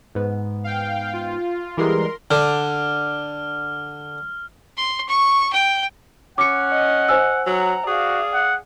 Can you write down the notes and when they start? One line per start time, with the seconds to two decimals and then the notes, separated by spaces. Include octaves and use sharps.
0.15 G#2 B3
0.64 F5 G5
1.13 F4
1.77 E3 G3 G#3 A#4 C6
2.31 D3 F6
4.77 C6
5.08 C#6
5.53 G5
6.38 C#4 F#5 D6 C#7
6.72 D#5
7.09 C5 G#5 E6
7.46 F#3 F#5 A#5
7.87 F#4 G#4 D5 F5
8.34 F#5